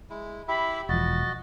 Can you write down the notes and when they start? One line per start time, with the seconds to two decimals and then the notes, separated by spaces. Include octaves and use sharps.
0.10 G#3 E4
0.48 E4 G4 E5 B5
0.89 E1 F3 F#4 D#5 A6